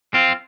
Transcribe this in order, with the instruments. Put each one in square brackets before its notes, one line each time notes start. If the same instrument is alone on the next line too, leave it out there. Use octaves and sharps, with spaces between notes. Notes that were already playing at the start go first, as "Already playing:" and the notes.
[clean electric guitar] C4 F4